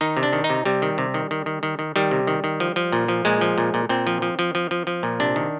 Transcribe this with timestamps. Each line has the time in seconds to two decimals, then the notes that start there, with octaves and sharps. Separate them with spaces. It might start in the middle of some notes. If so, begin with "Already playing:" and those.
0.01 D#3 D#4
0.17 C3
0.23 D4
0.33 D#3
0.44 D#4
0.50 C3
0.65 C3 G3
0.82 D#3
0.98 C3
1.14 D#3
1.31 D#3
1.46 D#3
1.63 D#3
1.79 D#3
1.96 D#3 G3
2.11 C3
2.27 D#3
2.44 D#3
2.60 F3
2.76 F3
2.92 A#2
3.08 F3
3.25 A#2 G#3
3.41 F3
3.58 A#2
3.74 A#2
3.89 A#2 C4
4.07 F3
4.22 F3
4.39 F3
4.55 F3
4.71 F3
4.87 F3
5.03 A#2
5.20 C3 D4
5.36 D#3